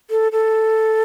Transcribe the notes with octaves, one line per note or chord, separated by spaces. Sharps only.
A4
A4